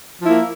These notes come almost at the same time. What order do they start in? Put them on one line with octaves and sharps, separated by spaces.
F3 E4 A#3